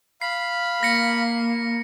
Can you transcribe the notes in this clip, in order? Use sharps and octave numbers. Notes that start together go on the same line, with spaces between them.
F5 B5 C7
A#3 A#6 C#7